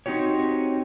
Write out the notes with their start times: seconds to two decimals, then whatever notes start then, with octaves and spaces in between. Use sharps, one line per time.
0.06 C4 D#4 F#4 G4 C#5